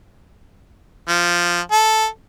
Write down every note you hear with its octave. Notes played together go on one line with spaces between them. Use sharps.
F3
A4